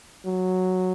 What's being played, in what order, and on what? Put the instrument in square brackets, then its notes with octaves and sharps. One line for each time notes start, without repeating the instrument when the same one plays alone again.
[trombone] F#3